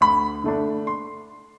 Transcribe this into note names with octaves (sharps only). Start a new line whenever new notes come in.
D2 B5
D3 A3 D4
C6